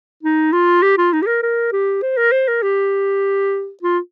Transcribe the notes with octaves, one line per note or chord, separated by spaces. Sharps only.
D#4
F4
G4
F4
D#4
G4
A#4
A#4
G4
C5
A#4
C5
A#4
G4
F4